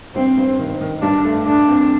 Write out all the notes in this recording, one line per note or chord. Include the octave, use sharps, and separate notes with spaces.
G2 C4
G2
D#3
D#3
G2 D4
A3
A3 D4
C4